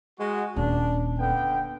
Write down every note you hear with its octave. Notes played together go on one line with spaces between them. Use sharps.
G#3 F#4
D#1 D4
D3 B3 G5